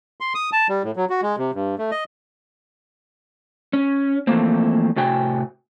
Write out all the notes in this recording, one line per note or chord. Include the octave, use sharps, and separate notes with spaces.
C6
D#6
A5
G3
A2
F#3
F#4
G#3
C3
G2
A3
D#5
C#4
E3 F3 A3 A#3 C4
A2 C3 F#4 G5 G#5